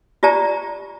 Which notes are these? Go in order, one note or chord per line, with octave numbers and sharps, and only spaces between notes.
F4 G4 D5 A5 A#5